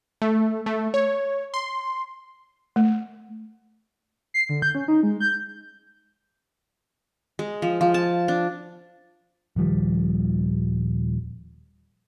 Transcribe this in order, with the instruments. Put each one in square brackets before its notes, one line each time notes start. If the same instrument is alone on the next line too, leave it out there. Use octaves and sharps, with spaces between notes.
[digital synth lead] A3
A3
C#5
C6
[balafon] A3
[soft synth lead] C7
D3
G6
C#4
D#4
G#3
G6
[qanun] G#3
F3
F3
A5
D4
[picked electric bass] D#1 D#3 F3 G3